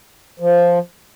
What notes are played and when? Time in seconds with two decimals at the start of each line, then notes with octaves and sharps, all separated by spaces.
0.40 F3